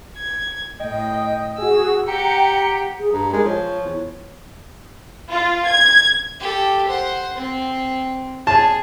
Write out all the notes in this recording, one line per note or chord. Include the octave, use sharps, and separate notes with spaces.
G#6
A2 D#5 G5
F#4 G#4 E6
G4 F#5 G5 A#5 C#7
G#4
G2 A#5
G#3 A#4
F3 C#5
E2
F4
G#6
G4 A4
C5 F#5
C4
G#4 A5